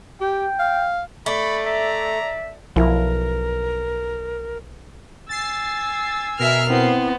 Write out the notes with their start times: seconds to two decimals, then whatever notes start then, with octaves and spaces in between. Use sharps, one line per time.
0.21 G4 G5
0.59 F5
1.26 A3 D5 B5
1.66 E5 A#5
2.76 B1 F3 E4 A#4
5.29 G#5 E6 A6 C7
6.39 B2 A#4 E5 F6 C7
6.70 B3 C4 E4 C5